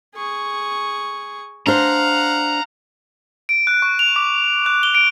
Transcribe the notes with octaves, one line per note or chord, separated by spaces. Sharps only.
G#4 C#6
D4 C5 F5 F#5 A#5
D7
F#6
C#6
F7
D6
F#6
G7
D7